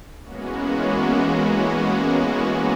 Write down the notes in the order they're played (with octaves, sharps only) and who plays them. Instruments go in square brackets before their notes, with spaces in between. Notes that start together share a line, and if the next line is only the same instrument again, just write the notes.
[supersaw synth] E3 G#3 A#3 B3 C#4 F#4